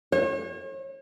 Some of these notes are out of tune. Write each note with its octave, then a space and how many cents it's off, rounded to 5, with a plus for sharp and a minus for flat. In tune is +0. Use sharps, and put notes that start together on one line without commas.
C#5 -40